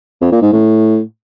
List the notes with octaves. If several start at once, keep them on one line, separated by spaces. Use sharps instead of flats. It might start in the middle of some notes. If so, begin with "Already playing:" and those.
F2
A#2
G#2
A2